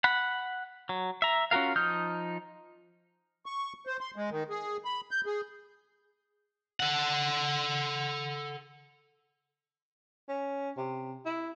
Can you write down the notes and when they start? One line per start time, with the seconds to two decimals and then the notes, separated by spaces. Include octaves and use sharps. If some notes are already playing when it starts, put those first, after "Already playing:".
0.04 F#5 B5
0.89 F#3
1.22 E5 A#5
1.51 C#4 F4 F#4 A#4 F5
1.76 F3 D#4 D#6 F6 G6
3.46 C#6
3.87 C5
4.01 C6
4.16 G#3
4.30 D#3
4.50 G#4
4.85 B5
5.11 G6
5.26 G#4
6.80 A4 F#5
10.29 C#4
10.77 C3
11.25 E4